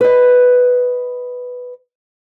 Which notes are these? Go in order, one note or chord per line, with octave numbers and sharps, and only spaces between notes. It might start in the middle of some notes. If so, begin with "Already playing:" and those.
B4 D#5